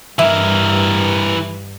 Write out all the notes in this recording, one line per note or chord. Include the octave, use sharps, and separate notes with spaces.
G2 E3 E4 A#4